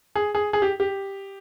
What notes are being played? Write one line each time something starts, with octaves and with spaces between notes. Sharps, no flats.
G#4
G#4
G#4
G4
G4